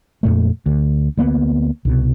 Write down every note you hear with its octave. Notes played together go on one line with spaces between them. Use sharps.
F2 A#2 A3
D2
D2 A#3 B3
C2 B2